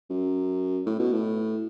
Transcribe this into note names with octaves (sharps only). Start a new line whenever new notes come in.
F#2
A2
B2
A2